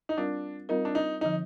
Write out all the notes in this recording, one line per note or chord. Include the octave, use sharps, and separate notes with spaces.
D#4
G3 C4 D4 F4 A#4
G3 C4 D#4 F4 A#4
D4
D#4
D3 F3 D#4